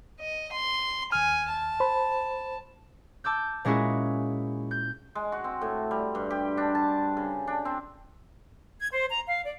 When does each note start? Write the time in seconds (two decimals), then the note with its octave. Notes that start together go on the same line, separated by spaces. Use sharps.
0.20 D#5
0.52 C6
1.12 D#2 G#5 F6
1.50 A5
1.80 C5 B5
3.24 A5 D6 E6 G6
3.65 A#2 G#3 C#4 E4 F#4 G#4
4.71 G6
5.15 G#3
5.32 F#4
5.44 C4
5.61 A2
5.91 G3
6.15 G2
6.30 G4
6.57 D4
6.75 A5
7.17 C#3
7.47 D4
7.65 C4
8.81 G#6
8.92 C5
9.10 A#5
9.27 F5
9.44 D5